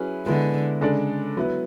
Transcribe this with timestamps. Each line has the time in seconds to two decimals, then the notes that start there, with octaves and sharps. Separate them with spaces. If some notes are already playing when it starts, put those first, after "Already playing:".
Already playing: F#3 C#4 E4 G#4 B4
0.26 D3 G#3 B3 E4 B4
0.81 C#3 G#3 D4 A4 D5
1.36 F#3 B3 E4 B4